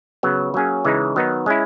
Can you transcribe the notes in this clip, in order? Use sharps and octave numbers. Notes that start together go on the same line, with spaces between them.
C#3 F#3 B3
F#3 A#3 C#4 G#4
C#3 E3 G#3 D#4
D#3 F#3 B3 D#4
G#3 C#4 E4